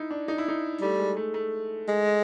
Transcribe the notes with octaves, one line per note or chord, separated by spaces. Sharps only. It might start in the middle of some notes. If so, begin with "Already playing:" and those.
Already playing: D#4 E4
D4
D#4
E4
D#4
G3 A3
G#3
A3
A3
G#3